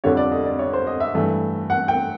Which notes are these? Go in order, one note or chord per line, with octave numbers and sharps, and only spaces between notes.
F1 F2 D3 G3 C#5
D5
D#5
D5
C#5
C5
D#5
E5
G2 E3 A3
F#5
G5